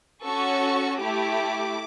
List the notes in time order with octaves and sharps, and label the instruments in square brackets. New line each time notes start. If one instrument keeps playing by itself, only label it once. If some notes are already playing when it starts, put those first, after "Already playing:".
[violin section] C#4 F#4 A4 C#6
A3 E4 G4 D6